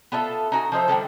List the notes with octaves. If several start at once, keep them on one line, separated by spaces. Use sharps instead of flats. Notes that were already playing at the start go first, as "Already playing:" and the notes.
B3 F4 A4 E5
D#4 F#4 G#5
F3 D#4 C5 E5
D3 G3 C#4 A4